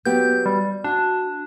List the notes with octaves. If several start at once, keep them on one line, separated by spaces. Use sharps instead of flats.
F#3 B3 G4 G6
G3
D4 F#4